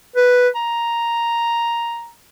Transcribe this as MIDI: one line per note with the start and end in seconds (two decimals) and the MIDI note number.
0.16 0.48 71
0.55 2.10 82